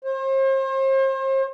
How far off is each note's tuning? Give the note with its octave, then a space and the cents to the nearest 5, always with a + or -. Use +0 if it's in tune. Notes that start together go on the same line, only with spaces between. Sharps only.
C5 +40